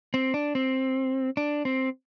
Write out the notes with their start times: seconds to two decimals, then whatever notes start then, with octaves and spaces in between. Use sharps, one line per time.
0.14 C4
0.34 D4
0.55 C4
1.37 D4
1.65 C4